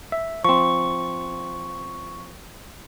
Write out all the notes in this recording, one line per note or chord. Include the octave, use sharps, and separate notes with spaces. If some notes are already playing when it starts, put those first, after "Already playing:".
E5
F3 C4 C#6